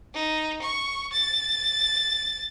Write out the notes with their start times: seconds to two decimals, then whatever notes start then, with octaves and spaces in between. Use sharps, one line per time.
0.14 D#4
0.62 C#6
1.12 A6